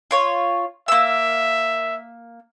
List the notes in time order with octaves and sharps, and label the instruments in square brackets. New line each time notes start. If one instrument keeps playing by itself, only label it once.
[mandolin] F4 C#5
[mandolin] A#3 E6 [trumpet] E5